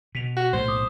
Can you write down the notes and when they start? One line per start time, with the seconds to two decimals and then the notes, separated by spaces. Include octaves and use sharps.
0.15 B2 B6 F7
0.37 F#4
0.53 B1 A2 A3 C5
0.68 D6 D#6